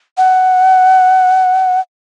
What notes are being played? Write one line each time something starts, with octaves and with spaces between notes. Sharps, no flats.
F#5